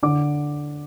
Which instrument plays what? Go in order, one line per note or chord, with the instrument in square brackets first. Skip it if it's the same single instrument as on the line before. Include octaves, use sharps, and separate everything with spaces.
[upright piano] D3 D6